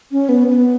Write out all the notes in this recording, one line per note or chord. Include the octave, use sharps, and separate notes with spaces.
C#4
B3
B3